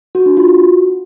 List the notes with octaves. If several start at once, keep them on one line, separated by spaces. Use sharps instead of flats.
F#4
D4
F4
F#4